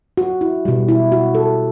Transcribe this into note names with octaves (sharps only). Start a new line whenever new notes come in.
F#4
E4
B2 G3
E4
F#4
A4